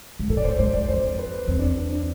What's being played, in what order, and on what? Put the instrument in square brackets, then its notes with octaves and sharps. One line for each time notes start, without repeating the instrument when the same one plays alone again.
[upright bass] G#2
[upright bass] A2 [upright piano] A4
[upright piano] D5
C5
[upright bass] G#2 [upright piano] C5
[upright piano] D5
[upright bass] F2 [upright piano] C5
[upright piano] B4
[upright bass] E2 [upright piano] C4
[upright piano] D4
C4
C4
D4